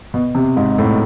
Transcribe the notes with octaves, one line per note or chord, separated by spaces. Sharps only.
B2
C3
G#2
A2